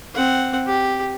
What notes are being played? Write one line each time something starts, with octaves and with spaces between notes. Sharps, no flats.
C4 F#5
G4